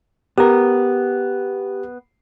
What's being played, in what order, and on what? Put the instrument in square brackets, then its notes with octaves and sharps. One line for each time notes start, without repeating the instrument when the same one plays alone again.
[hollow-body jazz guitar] B3 A#4 [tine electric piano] G4